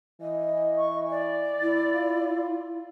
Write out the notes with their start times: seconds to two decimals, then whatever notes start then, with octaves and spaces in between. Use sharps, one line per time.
0.21 E3 D#5
0.78 C#6
1.10 D5
1.62 E4
1.94 F4